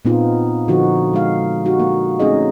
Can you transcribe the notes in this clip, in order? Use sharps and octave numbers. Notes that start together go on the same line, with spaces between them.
A#2 B3 C4 D#4 F4
D3 F3 D#4 F#4
G#3 D#4 F5
D#4 F#4 G4
A#3
A3 C4 C#4 D#4 G#4 D#5